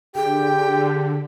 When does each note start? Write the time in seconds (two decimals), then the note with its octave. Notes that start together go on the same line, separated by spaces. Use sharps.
0.15 D3 G4 G#4 G5